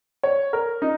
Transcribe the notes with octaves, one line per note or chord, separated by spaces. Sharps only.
C#5
A#4
D#4